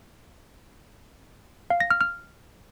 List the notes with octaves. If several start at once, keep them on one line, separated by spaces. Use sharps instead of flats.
F5
A#6
F6
F6